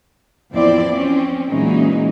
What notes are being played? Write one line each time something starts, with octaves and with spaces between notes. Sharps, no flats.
E2 F3 C4 E4 D5
C4 C#4
A#2 E3 F#3 G#3 C#4 D#4